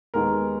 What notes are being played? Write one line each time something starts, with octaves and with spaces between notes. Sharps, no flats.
D#2 D#3 G#3 B3 A#4